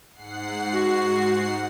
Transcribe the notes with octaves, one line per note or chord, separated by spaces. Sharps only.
G#2 F#5 C7
F#4